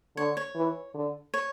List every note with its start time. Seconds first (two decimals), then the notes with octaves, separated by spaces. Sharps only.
0.17 D3 C#5
0.37 C#5
0.55 E3
0.94 D3
1.34 C#5